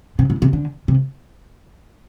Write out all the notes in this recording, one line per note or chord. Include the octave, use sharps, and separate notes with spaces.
C3
A2
C3
D3
C3